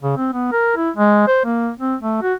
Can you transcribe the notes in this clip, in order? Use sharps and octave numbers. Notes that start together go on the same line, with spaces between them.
C#3
C4
B3
A#4
E4
G#3
C5
A#3
C4
A3
F#4